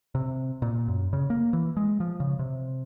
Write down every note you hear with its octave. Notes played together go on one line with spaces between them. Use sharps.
C3
A#2
F#2
C#3
A#3
E3
G#3
F3
C#3
C3